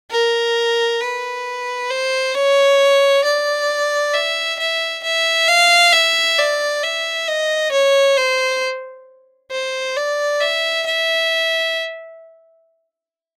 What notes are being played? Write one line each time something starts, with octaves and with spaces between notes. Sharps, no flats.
A#4
B4
C5
C#5
D5
E5
E5
E5
F5
E5
D5
E5
D#5
C#5
C5
C5
D5
E5
E5